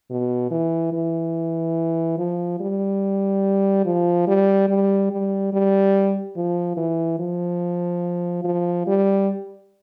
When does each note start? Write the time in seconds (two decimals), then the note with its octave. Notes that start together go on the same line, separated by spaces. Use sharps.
0.10 B2
0.51 E3
0.93 E3
2.18 F3
2.60 G3
3.85 F3
4.28 G3
4.69 G3
5.11 G3
5.53 G3
6.36 F3
6.77 E3
7.19 F3
8.44 F3
8.87 G3